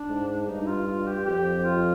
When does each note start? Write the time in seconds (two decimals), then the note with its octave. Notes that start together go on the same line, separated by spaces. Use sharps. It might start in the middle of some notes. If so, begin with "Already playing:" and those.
Already playing: D4
0.09 G#2
0.48 G2 D#4
0.61 D#4
0.67 F4
0.87 F4
1.07 G4
1.26 F2 G4
1.65 F4